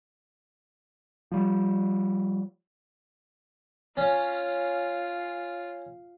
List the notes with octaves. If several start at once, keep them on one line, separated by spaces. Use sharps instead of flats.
F3 G3
C#4 F4